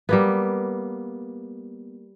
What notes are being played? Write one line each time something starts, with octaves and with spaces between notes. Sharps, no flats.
G3 A#3 B3